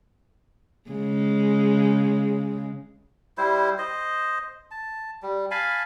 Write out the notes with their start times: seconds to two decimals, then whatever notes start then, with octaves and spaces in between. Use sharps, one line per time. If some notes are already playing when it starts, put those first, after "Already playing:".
0.90 C#3 G#3
3.38 G3 E4 C5
3.78 C5 D#5
4.71 A5
5.23 G3
5.51 F5 G#5 A5 B5